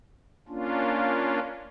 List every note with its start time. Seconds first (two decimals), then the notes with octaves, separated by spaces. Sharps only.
0.48 A#3 C#4 D4 F4